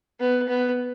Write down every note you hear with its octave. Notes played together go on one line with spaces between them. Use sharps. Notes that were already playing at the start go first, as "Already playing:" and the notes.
B3
B3